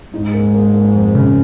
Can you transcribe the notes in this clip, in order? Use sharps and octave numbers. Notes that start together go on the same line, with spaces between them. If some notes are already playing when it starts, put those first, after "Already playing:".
G#2 D#4
A#3
A#3
A#3
F2
C#3